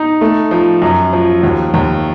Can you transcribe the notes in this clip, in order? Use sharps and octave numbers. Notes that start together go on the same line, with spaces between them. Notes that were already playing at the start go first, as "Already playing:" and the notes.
Already playing: D#4
A3
F3
F#2
F3
D#2
D#2